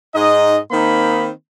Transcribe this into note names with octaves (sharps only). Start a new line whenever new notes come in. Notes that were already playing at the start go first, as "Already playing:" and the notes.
G#2 D#4 D#5
D#3 A#3 C4 D#4 B5